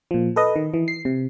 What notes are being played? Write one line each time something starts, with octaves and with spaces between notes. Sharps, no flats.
A#2 F3
A4 B4 D#5
D#3
E3
C7
C3